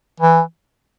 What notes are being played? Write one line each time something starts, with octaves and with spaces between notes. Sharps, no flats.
E3